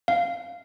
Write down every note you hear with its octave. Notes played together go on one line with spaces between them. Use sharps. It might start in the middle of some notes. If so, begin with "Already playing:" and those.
F5